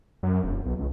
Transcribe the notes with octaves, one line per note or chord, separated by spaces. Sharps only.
F#2
E1
B1
C#2